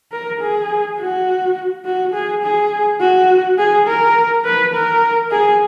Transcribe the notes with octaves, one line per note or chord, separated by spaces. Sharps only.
A#4
G#4
F#4
F#4
G#4
G#4
F#4
G#4
A#4
B4
A#4
G#4